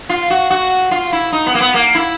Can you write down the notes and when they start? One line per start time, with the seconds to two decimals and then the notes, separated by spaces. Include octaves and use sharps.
0.09 F4
0.30 F#4
0.50 F#4
0.91 F4
1.13 E4
1.32 D#4
1.47 B3
1.55 A#3
1.61 B3
1.74 A#3
1.95 E4